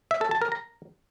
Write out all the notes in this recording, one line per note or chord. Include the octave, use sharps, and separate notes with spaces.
E5
A4
A5
A#4
A#5